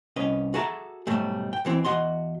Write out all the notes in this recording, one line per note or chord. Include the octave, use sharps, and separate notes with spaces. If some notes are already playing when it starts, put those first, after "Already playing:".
C2 C#4 B4 D#5
F#4 G#4 A4 E5 A#5
G#2 B2 F#3 G3 A3
G5
B1 E3 C4
E2 E3 F#4 D#5 C6